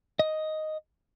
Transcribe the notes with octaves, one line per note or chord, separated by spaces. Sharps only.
D#5